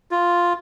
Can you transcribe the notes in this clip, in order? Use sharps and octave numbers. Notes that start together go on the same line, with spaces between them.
F4